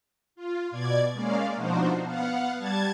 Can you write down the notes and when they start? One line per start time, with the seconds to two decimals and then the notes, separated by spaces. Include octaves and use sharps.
0.35 F4
0.71 B2 D5 G#6
1.13 G#3 A#3 C#4 D5 F5
1.56 B2 F3 D4 D#4 F#4 C5
2.02 B3 F5 F#5
2.58 G3 A5 G#6 A6